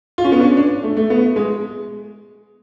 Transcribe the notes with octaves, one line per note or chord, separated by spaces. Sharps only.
F4
C#4
B3
D4
C#4
D4
A3
A3
B3
G#3